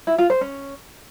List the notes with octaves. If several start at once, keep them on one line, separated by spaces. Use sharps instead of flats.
E4
F4
C5
C#4